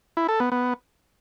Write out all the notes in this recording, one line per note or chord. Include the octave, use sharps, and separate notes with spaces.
E4
A4
B3
B3